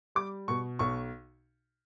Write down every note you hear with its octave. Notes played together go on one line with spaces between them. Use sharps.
G3 D6
B2 C#6
B1 C#6